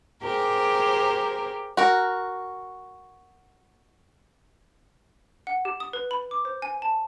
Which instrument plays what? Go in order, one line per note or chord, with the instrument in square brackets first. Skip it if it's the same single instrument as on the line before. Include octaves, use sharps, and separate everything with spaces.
[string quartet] G4 G#4 A#4 C5
[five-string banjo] F#4 A#4
[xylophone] F#5
G4
D#6
B4
B5
D6
C5
G#5
A5